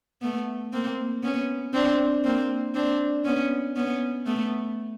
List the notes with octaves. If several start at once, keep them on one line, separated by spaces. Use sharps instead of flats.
A3 B3
A#3 C4
B3 C#4
C4 D4
A#3 C4
C4 D4
B3 C#4
B3 C#4
A3 B3